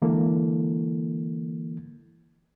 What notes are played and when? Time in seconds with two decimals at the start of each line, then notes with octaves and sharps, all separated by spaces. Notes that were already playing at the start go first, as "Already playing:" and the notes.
0.02 D3 E3 G#3 A#3 E4 A4